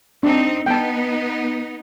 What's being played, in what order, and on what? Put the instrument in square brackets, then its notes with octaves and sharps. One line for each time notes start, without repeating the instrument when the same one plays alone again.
[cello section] C4 D#4 [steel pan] D4
[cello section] B3 D#4 [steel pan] G5 A5